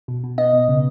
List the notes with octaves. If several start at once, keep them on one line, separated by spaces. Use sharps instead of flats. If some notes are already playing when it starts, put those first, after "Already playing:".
B2
B2
B3 D#5
B2
C#3